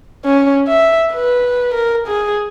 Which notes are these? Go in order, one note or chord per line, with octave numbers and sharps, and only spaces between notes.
C#4
E5
B4
A#4
G#4